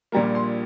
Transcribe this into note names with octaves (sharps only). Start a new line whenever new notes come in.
A#1 A#2 G3 A#3 A#5
C6